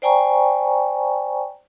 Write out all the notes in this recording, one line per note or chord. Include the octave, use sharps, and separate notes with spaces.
C5 D5 G5 G#5 A#5 C#6